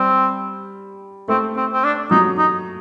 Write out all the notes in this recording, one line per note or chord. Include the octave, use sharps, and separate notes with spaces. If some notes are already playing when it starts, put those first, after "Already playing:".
Already playing: G3 C4
A3 C4
C4
C4
D4
F#3 D#4
D#4